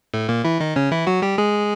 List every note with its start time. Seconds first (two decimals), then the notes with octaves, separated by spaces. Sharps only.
0.14 A2 A3
0.29 A#2 A#3
0.44 E3 E4
0.60 D#3 D#4
0.76 C#3 C#4
0.91 E3 E4
1.07 F#3 F#4
1.22 G3 G4
1.38 G#3 G#4